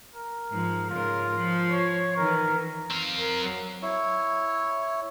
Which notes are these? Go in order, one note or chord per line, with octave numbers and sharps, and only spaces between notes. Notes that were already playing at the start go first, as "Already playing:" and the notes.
A#4
G#2 F3
G#2 C#3 F4 A#4
F3
C#5
D#3 E3 A#4
C4 F5
A#4
F#3
E4 C#5